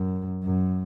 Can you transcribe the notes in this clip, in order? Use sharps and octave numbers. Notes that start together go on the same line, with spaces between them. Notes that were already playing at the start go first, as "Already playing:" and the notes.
Already playing: F#2
F#2